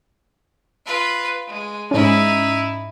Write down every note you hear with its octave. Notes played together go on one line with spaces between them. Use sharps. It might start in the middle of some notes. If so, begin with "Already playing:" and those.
F4 B4
G#3
G#2 C#4 D#4 E4